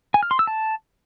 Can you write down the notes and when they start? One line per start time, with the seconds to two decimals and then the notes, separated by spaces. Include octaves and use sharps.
0.14 G#5
0.23 F6
0.31 C6
0.39 E6
0.47 A5